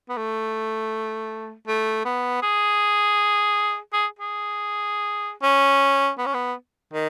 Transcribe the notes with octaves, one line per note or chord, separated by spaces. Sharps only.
B3
A3
A3
B3
G#4
G#4
G#4
C#4
B3
C#4
B3
D#3